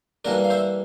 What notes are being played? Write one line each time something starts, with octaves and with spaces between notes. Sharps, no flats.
E3 G3 A#3 D4 A#4 D5
F5
C5 E5